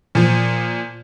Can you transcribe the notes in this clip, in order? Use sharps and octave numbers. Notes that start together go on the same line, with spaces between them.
A#2 F3